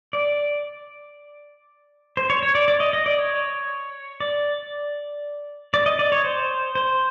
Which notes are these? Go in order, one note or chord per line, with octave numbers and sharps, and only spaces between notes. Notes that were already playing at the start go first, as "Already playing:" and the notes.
D5
C5
C#5
C#5
D5
D5
D#5
D#5
D5
C#5
D5
D5
D#5
D5
C#5
C5
C5